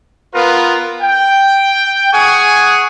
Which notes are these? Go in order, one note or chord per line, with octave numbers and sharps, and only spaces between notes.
B3 F4 A#4 B4
G5
G#4 F#5 G#5 C#6